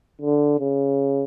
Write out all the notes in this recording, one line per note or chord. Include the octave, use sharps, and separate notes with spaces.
D3
C#3